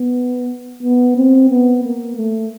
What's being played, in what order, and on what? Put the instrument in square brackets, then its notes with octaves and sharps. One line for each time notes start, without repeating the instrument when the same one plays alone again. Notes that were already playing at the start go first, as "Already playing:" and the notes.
Already playing: [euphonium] B3
B3
C4
B3
A#3
A3